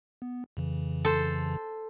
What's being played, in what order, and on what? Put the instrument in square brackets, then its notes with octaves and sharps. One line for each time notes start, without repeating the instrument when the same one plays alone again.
[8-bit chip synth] B3
F2 C#3 E3
[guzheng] A4 C5